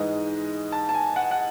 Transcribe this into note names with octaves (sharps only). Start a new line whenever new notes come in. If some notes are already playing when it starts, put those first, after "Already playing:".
Already playing: G#2 E3 G#3 D#5
A5
A5
G#5
F#5
F#5